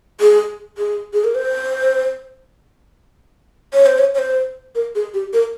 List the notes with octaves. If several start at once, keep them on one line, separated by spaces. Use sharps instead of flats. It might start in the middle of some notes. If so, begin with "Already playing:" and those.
G#4
G#4
G#4
A#4
C5
C#5
C5
C#5
C#5
C5
A#4
G#4
G4
A#4